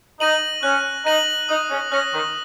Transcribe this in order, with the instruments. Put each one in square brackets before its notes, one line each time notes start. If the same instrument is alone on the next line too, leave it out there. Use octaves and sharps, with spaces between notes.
[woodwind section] D#4 [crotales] A#6 D#7 F#7
[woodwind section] C#4 [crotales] F#6
[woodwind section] D#4 [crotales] A#6 D#7 F#7
[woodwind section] D#4 [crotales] D#6
[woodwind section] C#4
[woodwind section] C#4 [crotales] F#6 A#6
[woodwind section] D#3